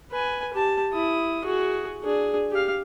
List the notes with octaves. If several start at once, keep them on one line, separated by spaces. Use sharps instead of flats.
B4 G#5
G4 A5
E4 D#6
F#4 G#4
D4 G#4
G4 F5